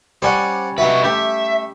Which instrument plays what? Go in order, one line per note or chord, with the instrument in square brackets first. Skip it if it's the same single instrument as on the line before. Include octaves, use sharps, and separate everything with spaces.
[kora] G3 C#4 [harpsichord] C5 D5 F#5
[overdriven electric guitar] D#4 B4 [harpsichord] F#4 E5
[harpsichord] A3 [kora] G4 [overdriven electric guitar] E5